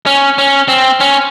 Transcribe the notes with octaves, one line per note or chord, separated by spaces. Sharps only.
C#4
C#4
C4
C#4